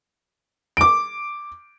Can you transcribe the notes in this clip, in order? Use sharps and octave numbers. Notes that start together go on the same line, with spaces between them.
D6 D7